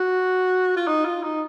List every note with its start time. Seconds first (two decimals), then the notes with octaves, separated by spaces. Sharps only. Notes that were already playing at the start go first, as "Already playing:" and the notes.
Already playing: F#4
0.76 F4
0.88 D#4
1.05 F4
1.23 D#4